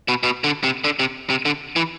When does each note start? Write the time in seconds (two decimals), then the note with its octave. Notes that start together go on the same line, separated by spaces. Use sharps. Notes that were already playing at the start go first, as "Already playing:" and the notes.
0.08 B2
0.23 B2
0.44 D3
0.64 C3
0.84 D3
0.99 C3
1.30 C3
1.45 D3
1.76 E3